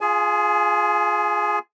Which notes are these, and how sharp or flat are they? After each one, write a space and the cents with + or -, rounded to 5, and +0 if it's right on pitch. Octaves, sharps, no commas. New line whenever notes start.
F4 +0 G#4 +0 G#5 +35